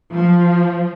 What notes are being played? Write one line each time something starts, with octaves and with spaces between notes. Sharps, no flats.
F3